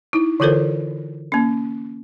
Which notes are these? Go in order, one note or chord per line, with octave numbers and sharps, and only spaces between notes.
D#4 E4
D3 E3 F4 A4 A#4 C5
A#3 C#4